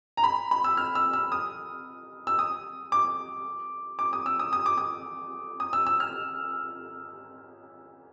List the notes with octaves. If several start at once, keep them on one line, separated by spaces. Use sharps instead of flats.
A#5
B5
B5
E6
F6
E6
E6
D#6
E6
D#6
D6
D6
D#6
E6
D#6
D#6
D6
D#6
D#6
E6
E6
F6